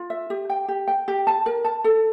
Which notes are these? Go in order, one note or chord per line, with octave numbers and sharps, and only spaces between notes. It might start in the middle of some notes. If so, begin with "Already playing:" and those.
Already playing: F4
E5
G4
G5
G4
G5
G4
A5
A#4
A5
A4